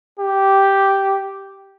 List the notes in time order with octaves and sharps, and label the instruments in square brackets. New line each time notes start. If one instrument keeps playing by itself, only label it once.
[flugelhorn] G4